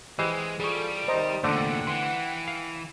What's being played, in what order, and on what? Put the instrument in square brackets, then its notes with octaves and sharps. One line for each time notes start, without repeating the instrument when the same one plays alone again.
[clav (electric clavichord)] E3 C5 [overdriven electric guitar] G#3 [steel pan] G4 D#5
[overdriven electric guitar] G3 [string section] F4 A4 [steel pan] G#4 C#6
[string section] C3 D#3 [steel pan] C5 D#5 A#5
[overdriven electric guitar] E2 A#2 [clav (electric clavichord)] D3 A3 [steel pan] D5 [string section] F#5 G5
[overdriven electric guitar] E3 [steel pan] C6
[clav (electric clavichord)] F5